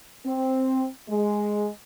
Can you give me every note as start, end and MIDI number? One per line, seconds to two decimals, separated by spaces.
0.24 0.86 60
1.08 1.67 56